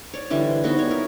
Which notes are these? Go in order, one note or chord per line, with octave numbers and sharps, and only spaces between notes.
C#5 D5
D3 E3 G3
C5
B3 D#4 E4 F#4
C#5
A#4